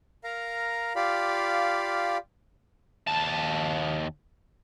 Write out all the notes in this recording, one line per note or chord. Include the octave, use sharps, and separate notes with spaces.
A#4 F5 A#5
F4 G4 D5 F5 B5
D#2 A5